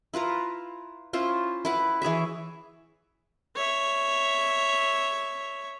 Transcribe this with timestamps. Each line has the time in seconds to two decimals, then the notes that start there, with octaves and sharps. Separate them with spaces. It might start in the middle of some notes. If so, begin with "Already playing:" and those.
0.14 E4 F4 B4 A#5
1.13 C#4 E4 F4 C5
1.65 E4 B4 F#5
2.02 E3 G#4 C#5 E5
3.56 C#5 E5